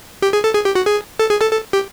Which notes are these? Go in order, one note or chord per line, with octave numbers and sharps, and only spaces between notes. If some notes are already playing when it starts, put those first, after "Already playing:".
G4
G#4
A4
G#4
G4
F#4
G#4
A4
G#4
A4
A4
G4